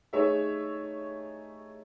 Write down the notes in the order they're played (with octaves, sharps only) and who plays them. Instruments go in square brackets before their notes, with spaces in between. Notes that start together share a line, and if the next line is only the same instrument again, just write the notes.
[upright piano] A3 D#4 G#4 C#5 E5